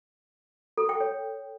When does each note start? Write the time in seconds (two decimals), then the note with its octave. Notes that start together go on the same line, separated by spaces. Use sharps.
0.77 A4
0.89 G5
1.00 C#5